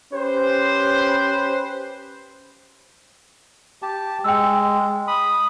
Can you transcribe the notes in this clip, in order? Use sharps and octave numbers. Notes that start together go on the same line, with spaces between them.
C#4 G4 B4 C5
G4 A5
G#3 G5 E6
B5 D#6